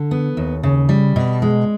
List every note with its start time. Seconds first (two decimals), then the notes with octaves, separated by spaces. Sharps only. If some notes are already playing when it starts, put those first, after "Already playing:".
Already playing: D3
0.11 B3
0.37 D#2
0.63 C#3
0.89 G3
1.16 B2
1.42 G#3